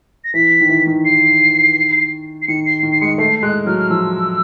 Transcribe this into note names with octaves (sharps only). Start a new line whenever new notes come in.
A#6
E3 B6
D#3
E3
D#3
C7
C7
D#3 C#7
C7
D#3
C7
G#3 C#7
A3 C7
G#3 F#6
F#3 F6
F6
F3 E6